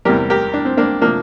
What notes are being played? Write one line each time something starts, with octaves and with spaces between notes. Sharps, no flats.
E2 C3 G3 G4 A#4
G4 A#4
D4
C4
A#3 D4
C3 F3 A#3 D4